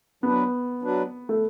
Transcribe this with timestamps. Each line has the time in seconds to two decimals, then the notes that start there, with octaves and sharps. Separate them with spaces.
0.23 F#3 B3 D4 B4
0.82 F#3 D4 B4
1.29 A3